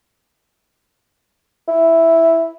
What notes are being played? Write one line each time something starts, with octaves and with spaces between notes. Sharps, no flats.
E4